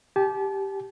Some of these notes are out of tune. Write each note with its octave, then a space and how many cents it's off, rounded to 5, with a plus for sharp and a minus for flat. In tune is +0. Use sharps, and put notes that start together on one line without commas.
G4 +0 A5 -40